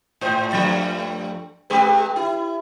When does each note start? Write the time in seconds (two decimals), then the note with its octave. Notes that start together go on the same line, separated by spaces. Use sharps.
0.21 G#2 C5
0.52 G2 F3 A3
1.70 G#3 G4 B4
2.16 E4